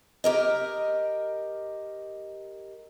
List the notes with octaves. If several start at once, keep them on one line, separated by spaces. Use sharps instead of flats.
G4 A#4 D#5